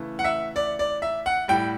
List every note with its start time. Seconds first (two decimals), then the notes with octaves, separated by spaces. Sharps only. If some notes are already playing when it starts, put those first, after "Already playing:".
Already playing: C#3 E3 A3
0.19 F#5
0.24 E5
0.56 D5
0.79 D5
1.02 E5
1.26 F#5
1.48 A2 G3 G5